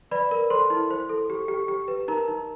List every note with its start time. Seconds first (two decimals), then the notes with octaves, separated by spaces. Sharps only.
0.11 B4 D5 B5
0.31 A#4
0.50 A4 C5 C6
0.70 E4
0.90 C5
1.10 A4
1.30 G4
1.48 G4
1.68 G4
1.88 B4
2.08 D#4 A#4 A#5
2.28 D#4